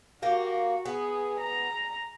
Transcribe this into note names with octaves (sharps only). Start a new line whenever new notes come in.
A#3 F#4 G4
B3 G#4
A#5